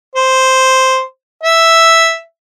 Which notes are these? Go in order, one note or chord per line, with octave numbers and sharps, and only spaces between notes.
C5
E5